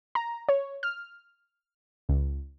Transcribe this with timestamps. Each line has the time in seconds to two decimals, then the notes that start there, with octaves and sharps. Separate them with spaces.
0.15 A#5
0.49 C#5
0.83 F6
2.09 C#2